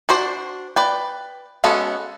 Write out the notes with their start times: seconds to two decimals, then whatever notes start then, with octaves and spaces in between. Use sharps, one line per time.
0.09 D4 F#4 C5 D5
0.76 B4 D5 G5
1.64 G#3 B3 C#4 F#4 A4